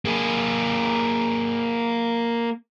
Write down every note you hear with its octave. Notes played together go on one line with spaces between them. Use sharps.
A#3 G#4